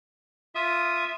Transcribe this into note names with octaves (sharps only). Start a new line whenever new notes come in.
F4 E5 D#6